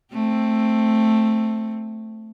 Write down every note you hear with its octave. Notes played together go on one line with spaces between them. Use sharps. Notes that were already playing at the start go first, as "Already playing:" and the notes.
A3 C4